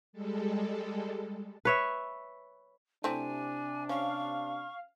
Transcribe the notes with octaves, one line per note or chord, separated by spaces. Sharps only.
G3 G#3 A4
B4 C#5 E5
C3 A3 C4 D4 E4 G#5
C#4 F5 C#6